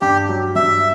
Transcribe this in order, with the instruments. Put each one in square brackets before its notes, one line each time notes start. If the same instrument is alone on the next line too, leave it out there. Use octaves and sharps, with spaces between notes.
[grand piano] G2 [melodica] G4
[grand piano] F#3
[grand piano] G2 [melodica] E5